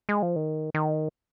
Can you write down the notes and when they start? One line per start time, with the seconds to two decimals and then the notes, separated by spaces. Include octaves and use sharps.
0.09 G#3
0.23 F3
0.36 D#3
0.74 D#3